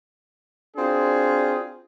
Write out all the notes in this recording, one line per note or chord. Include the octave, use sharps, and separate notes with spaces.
C4 D4 F4 F#4 G#4